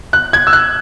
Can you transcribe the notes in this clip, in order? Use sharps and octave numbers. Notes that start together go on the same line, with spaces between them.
F#6
G#6
E6
F#6